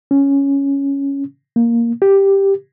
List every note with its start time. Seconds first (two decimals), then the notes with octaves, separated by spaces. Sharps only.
0.11 C#4
1.56 A#3
2.02 G4